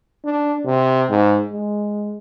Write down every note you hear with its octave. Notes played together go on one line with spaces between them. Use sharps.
D4
C3
G#2
G#3